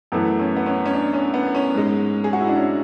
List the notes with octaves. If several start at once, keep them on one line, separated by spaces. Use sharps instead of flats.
F#2 E3 A3 B3
C#4
B3
C#4
C#4
D4
C#4
B3
C#4
G#2 G#3
G#4
F#4
E4
D4
C#4